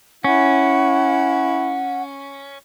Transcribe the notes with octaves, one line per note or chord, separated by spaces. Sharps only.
C#4 E4 F#5